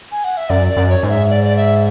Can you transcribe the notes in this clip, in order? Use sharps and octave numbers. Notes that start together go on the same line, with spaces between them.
G#5
F#5
E5
F#2 D5
D5
F#2
C#5
G#2
E5
D5
D5
E5